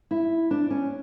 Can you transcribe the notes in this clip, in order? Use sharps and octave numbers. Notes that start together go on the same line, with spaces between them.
E4
D4
C#4